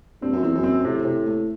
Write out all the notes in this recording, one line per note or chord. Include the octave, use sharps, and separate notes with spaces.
G2 C4
F#2
E2 C4
F#2
C4
A2 C3
C3
A3